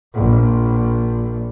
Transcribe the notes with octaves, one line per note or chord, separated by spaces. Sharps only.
A#1